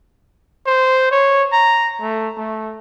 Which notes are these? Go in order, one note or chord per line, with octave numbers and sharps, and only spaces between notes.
C5
C#5
A#5
A3
A3